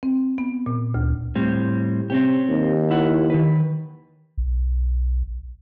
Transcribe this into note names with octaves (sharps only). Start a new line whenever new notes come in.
C4
B3
A#2
D2
A2 G3 C4
C3 C4 C#4 G4
D#2
E4 F#5
D#3 B4
B1